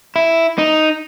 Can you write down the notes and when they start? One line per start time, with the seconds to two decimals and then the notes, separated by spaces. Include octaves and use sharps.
0.16 E4
0.58 D#4